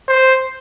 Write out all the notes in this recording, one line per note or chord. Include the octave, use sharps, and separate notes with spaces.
C5